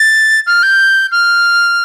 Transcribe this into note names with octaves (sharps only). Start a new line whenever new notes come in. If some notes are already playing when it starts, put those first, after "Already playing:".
Already playing: A6
F6
G6
F6